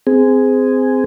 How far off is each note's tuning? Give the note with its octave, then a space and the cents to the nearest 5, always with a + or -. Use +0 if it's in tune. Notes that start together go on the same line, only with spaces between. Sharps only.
C4 -20 G#4 +0